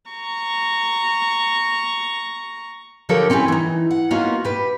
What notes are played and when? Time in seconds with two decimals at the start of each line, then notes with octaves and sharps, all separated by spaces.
0.11 A#5 C#6
3.09 D3 F3 G4 A4 A#4 C#5
3.30 C4 C#4 E4 G#4 B4
3.48 E3 D#4
3.91 F#5
4.11 A#3 B3 C#4 D#4 F4 F#4
4.44 G4 B4